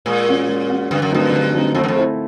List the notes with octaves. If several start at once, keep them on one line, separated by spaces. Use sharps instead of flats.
A#2 G#3
C#4 F#4
G#3
C#4 F#4
G2 D3
F#2
G2 F#3 A3 C4 D#4
D3
F#3 A3 C4 D#4
F2 A3
F#2
F2
C4 E4 A4